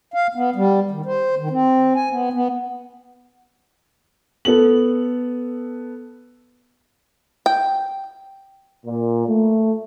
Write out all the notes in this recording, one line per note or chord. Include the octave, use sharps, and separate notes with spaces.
F5
B3
G3
D#3
C5
D#3
C4
G#5
B3
B3
B3 A4 F#7
G5
A#2
A3